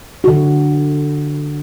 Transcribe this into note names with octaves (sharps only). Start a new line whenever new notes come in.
D3 F#4